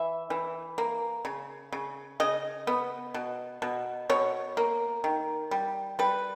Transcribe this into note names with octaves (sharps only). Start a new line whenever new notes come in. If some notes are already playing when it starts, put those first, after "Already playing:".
Already playing: E3 E5
E3
A#3
C#3
C#3
C#3 D#5
B3
B2
B2
B2 C#5
A#3
D#3
G3
G3 B4